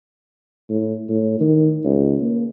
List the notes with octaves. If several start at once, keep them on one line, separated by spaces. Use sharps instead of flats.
A2
A2
D#3
C#2
A#3